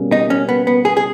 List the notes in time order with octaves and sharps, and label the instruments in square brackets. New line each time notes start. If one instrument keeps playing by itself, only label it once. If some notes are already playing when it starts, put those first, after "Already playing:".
Already playing: [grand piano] B2 G3 A#3 C#4 G#4
[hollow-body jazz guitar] D#4
C#4
B3
B3
G#4
G#4